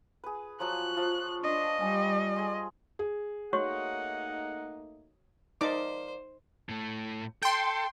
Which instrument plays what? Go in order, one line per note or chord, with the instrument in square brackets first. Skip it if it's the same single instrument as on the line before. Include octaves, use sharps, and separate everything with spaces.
[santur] G#4 B4
[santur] F3 F#3 C#5 [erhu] F#6
[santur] F3 F4
[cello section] D4 [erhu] D#5
[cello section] G3 [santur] G#5
[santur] G#4 C6
[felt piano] G#4
[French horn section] A3 A#3 D#4 [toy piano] F#4 C#5 C#6 [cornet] F#5
[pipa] F3 A#4 D5 [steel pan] D#4 D6 [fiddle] C5
[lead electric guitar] A2 A3
[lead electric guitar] A4 [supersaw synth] G5 C6